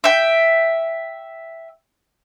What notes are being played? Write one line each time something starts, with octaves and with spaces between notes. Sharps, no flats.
E5 G5